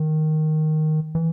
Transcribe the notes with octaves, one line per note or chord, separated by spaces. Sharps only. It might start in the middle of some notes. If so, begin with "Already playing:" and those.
Already playing: D#3
E3